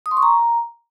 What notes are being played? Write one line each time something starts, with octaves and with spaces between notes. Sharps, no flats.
D#6
C6
C#6
A#5